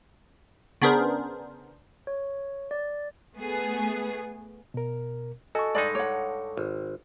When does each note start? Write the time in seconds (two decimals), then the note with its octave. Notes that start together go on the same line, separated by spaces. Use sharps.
0.82 C#3 B3 D4 G#4 A#4 C5
2.07 C#5
2.71 D5
3.36 A3 B3 G#4
4.74 B2 A#4
5.55 F#4 A4 D#5 G#5 A5 C#6
5.75 G2 G#3 D#4 D5
5.95 C#5 F#5 D6
6.57 G#1